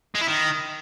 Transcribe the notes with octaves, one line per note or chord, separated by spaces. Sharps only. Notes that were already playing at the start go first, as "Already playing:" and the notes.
G#3
E4
D#3